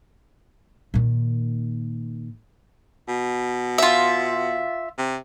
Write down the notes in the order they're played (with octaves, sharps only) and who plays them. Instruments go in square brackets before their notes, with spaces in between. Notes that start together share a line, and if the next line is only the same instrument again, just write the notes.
[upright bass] A#2 D#3
[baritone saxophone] B2
[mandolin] F4 E5
[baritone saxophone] C3